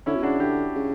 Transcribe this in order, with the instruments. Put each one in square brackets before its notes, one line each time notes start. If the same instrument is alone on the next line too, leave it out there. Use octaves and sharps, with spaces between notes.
[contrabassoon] D3 [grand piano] C#4 E4
[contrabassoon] B2
[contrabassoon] C#3 [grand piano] D4 F#4
[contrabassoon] D3 [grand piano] E4 G4
[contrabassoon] C#3